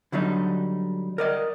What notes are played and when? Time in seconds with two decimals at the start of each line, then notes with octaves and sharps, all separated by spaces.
0.12 D3 F#3 G3 D#4
1.18 A#4 D5 D#5